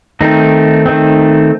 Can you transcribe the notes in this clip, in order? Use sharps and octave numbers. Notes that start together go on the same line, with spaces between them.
D#3 A3 C4 D#4
D#3 A3 C4